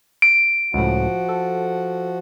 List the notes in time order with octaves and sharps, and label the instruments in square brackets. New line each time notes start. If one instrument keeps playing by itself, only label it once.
[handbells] D7
[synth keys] C#2 A2 [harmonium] F3 F#4 F#5
[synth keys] A4